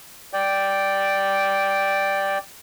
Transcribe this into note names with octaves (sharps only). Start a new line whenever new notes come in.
D5 G5